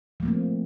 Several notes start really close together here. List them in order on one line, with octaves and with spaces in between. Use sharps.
F3 A3 A#3 C4